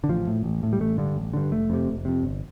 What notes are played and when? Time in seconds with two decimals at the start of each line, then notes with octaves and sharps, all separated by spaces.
0.04 D3
0.09 A1 F3
0.27 A2
0.44 A1
0.63 A2
0.73 G3
0.80 A1 A3
0.98 G2 D3
1.16 A1
1.33 G2 D3
1.51 F1 A3
1.70 F2 C3
1.88 F1
2.05 F2 C3
2.23 G1